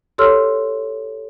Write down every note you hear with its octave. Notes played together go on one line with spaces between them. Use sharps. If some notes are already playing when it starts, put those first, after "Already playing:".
G4 A4 C#5 C6 E6 F6